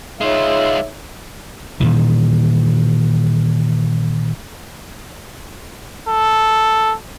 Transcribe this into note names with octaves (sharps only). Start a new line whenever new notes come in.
G#3 D#4 F4 G#4 C#5 E5
A#2 D#3 E3
A4